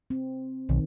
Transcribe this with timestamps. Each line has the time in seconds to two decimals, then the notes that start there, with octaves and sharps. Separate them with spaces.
0.10 C4
0.69 B1 D#3